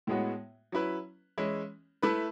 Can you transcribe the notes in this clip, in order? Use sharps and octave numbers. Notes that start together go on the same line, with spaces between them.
A2 G#3 B3 F#4 C#5
F#3 C#4 E4 B4
E3 G#3 C#4 E4
A3 E4 B4